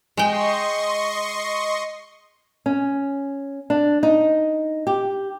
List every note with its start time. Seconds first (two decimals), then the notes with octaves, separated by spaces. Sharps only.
0.17 G#3 D#5 G5 C6 C#6
2.66 C#4
3.70 D4
4.03 D#4
4.87 G4